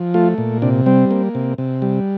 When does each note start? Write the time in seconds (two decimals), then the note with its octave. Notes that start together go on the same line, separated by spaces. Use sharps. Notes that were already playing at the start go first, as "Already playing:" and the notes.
Already playing: F3
0.14 A3 F4
0.38 A#2
0.62 C3 D4
0.86 G3 C4
1.11 A#3
1.35 C3
1.58 C3
1.82 G3